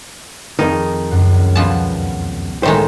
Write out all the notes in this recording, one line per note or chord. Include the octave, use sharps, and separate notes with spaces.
F2 G#2 D#3 D#4 G#4
C#2 F#2
B2 F3 G3 B3 F4 A5
A2 D#3 G#3 C5